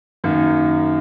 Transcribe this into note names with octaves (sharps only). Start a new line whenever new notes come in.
F#2 D#3 A#3